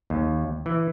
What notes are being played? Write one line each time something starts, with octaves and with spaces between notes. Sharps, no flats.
D#2
E3